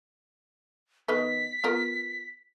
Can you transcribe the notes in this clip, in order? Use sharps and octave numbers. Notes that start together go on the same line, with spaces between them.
D#3 B3 B4 B6
B3 F4 A#4